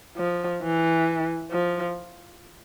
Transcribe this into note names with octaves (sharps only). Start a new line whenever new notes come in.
F3
E3
F3